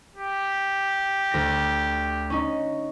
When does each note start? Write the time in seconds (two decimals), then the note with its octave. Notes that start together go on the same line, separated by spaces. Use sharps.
0.16 G4
1.31 D2 A#6
2.30 C#4 D#4